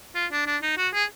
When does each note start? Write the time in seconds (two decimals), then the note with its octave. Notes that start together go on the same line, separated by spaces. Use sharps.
0.15 F4
0.32 D4
0.47 D4
0.62 D#4
0.77 F#4
0.94 G#4